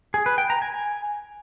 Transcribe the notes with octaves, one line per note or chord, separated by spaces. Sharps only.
G#4
B4
G5
A#5
G#5